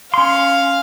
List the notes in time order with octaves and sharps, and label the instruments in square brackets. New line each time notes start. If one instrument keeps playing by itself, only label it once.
[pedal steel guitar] C#4 C6 [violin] F5